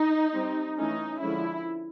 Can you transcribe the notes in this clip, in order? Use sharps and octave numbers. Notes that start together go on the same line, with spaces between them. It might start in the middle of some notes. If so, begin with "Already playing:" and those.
Already playing: D#4
G3 C4
E3 A3 C#4 D#4
D3 F3 G#3 C#4 E4